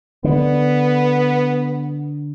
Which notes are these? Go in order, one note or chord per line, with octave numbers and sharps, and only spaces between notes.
D3 B3